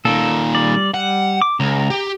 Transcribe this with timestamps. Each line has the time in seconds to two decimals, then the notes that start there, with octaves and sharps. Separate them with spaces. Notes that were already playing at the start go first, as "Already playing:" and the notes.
0.05 A#2 D#3 A4
0.55 G3 D5
0.94 G3 F#5
1.42 D6
1.60 C#2 A#5
1.90 G4